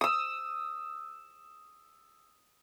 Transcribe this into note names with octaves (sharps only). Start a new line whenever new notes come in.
D#6 E6